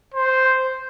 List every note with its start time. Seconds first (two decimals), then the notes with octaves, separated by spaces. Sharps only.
0.14 C5